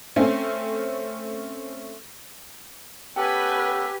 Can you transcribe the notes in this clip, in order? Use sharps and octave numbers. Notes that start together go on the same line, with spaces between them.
A3 C4 C#4
B3 C#4 G4 A4 B4 G5 G#5